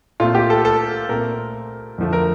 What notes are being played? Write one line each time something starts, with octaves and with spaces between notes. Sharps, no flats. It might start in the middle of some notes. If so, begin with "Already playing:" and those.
A#2 A3 C4 F4
G4
A4
A4
A#2 A3 C4 A#4
F2 D3 F3 A3
A#4